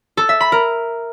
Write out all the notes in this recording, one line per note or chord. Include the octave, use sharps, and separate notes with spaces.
A4
E5
B5
A#4